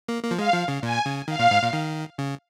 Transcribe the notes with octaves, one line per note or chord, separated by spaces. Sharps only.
A#3
A#3
F3
G#3 F5
F3
C#3
A#2 G#5
C#3
D#3 F5
A#2
G#2
A#2
D#3
C#3